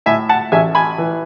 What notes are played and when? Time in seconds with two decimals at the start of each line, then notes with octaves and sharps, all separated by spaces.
0.06 A2 E5 G#5
0.29 F#5 A5
0.52 A1 E5 G#5
0.75 G#5 B5
0.98 E3